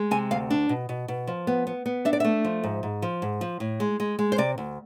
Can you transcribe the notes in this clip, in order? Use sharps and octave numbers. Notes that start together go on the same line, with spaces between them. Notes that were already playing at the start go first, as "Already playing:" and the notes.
Already playing: G#3
C3 G#5
D2 F5
D4
B2
B2
B2
F3
B3
B3
B3
D4 E5
D5
A3 E5
F3
G#2
G#2
F3
G#2
F3
A2
G#3
G#3
G#3
C5
C3 D5
D2